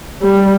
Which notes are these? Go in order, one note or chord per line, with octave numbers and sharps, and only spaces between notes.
G3